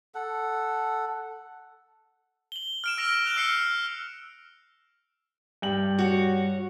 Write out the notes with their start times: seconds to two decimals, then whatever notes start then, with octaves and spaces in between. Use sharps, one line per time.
0.15 A4 F#5
2.52 F#7 G7
2.84 F6 D7 E7
2.97 E6 A#6 D7 F7
3.24 F6 F#6 F7
3.36 E6 F6 C7 C#7
5.62 G2 G5 F#7
5.99 F#4 C#5